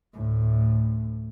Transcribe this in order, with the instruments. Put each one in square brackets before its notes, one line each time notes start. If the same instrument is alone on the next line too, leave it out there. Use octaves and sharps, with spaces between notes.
[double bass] D2 A2